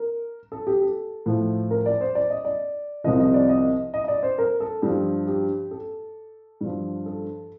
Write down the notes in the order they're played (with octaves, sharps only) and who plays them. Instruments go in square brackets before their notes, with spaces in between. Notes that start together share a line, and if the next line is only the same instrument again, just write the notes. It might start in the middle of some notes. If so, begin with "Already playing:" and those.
Already playing: [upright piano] A#4
A4
G4
A4
A2 F3
A#4
D5
C5
D5
D#5
D5
C2 C3 F3 D#5
D#5
D5
D#5
D#5
D#5
D5
C5
A#4
A4
G2 F3 G4
G4
A4
G2 F3
A4